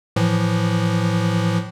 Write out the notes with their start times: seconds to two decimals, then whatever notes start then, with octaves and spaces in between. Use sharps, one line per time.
0.16 A2 E3 F3